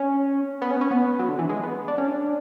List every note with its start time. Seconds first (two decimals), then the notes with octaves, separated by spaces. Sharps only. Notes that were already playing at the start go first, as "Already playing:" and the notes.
Already playing: C#4
0.62 B3
0.71 C#4
0.77 B3
0.81 C#4
0.91 B3
1.19 F#3
1.29 D3
1.39 E3
1.49 G#3
1.63 B3
1.88 D4
1.98 C#4
2.08 D4